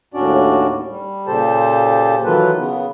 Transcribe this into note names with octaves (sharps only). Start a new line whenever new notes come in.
D#2 A2 C#4 D4 F#4 D5
G3
A#2 C#3 G4 A4 C5 A5
D#3 E3 F#3 F4 A4 B4
C#3 B3